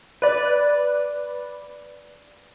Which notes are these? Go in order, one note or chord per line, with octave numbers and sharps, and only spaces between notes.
B4 D5